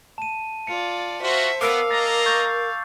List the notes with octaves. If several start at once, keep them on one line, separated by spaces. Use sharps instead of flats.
A5 D#7
F4 D5 C#7
F4 F#4 C5 E5
B3 A#4 F5 D6 E6 C7
A#3 D#5 A#5 A6
C#6 G6 A6